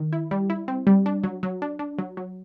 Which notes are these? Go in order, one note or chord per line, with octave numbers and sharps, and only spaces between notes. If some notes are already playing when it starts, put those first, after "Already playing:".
Already playing: D#3
E4
G3
E4
C4
G3
D4
F#3
F#3
D4
D4
F#3
F#3